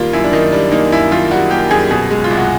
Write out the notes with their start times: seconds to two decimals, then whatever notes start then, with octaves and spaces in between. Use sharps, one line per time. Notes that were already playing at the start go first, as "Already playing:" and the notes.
Already playing: D#3 G3 A#3 F4
0.13 F#2 E4
0.24 D4
0.33 D#3 D#4
0.52 G3 D4
0.72 A#3 D#4
0.92 F#2 E4
1.11 D#3 F4
1.31 G3 F#4
1.51 A#3 G4
1.71 F#2 G#4
1.91 B2 G#4
2.11 G#3
2.24 F4
2.31 C2
2.37 F#4